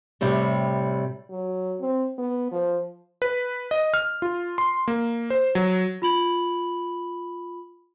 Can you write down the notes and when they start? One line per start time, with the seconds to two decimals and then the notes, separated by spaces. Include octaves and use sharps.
0.21 A2 C3 G3
1.30 F#3
1.81 C4
2.18 B3
2.52 F3
3.22 B4
3.71 D#5
3.94 F6
4.22 F4
4.58 C6
4.88 A#3
5.30 C5
5.55 F#3
6.02 F4 B5 F#7